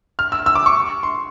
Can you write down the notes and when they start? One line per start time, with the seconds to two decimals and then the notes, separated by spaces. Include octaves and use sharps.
0.19 F6
0.32 E6
0.46 E6
0.55 D6
0.66 C#6
1.03 C6